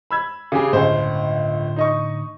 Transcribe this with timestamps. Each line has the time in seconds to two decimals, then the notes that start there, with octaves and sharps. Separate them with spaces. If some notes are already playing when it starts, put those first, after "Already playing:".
0.11 B5 E6 G#6
0.52 C#3 G4 G#4
0.73 G1 C#2 A2 D3 C5
1.76 D#4 D#5 C#6